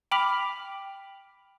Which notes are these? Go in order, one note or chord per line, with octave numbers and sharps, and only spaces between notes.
G5 B5 D6 F6 B6 F7